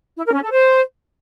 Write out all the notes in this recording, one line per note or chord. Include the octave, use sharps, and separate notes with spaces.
E4
A#4
C#4
A4
C5